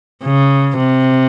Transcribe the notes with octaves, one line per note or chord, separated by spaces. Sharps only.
C#3
C3